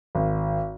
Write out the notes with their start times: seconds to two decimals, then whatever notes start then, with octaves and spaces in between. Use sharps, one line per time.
0.15 G#1